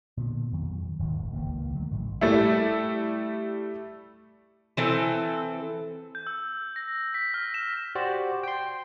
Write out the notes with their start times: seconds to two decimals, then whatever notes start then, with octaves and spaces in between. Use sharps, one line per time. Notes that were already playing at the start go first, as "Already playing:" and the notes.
0.17 A#2 D3 B3
0.52 F2 D#3 F#3
0.99 D#1 G#1 D2 D#3
1.33 C#2 D#3 E3 A#3
1.75 D3 F#3 A3
1.91 A1 A2
2.21 G3 A3 E4
4.77 E3 C4 A4
6.15 G6
6.27 E6
6.76 A#6
7.14 B6
7.34 F6
7.54 E7
7.95 F#4 G4 C5 D5
8.43 G5 C6